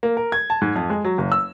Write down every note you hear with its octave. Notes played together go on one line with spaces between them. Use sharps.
A#3
A#4
G#6
A5
G#2
F2
G#3
F#3
F#1
E6